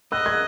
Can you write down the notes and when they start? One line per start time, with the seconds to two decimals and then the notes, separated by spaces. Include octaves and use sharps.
0.12 D#5 E6 F#6
0.26 F#6 G#6